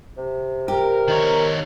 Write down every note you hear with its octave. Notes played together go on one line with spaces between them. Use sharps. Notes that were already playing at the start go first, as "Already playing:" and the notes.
C3
G4 A#4
D#3 C#5